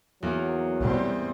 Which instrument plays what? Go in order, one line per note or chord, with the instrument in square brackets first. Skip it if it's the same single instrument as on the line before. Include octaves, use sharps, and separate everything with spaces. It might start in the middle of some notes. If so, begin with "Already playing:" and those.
[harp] E2 A#3 A#4 [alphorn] F#3
[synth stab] B1 B2 [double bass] G3 C4